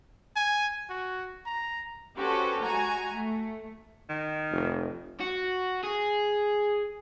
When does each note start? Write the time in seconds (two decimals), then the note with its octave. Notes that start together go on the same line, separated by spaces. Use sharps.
0.36 G#5
0.90 F#4
1.46 A#5
2.17 C#4 F#4 G4 A4 B4 C5
2.63 G#3 F#4 G#5 A#5
3.13 A3
4.09 D#3
4.51 F1
5.21 F#4
5.83 G#4